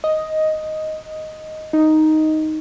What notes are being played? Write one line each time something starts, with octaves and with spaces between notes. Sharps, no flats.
D#5
D#4